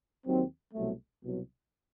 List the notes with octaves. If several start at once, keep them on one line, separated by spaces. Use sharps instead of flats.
D#2 D#3 F#3 C4
C2 B2 F#3 A3
C2 B2 F#3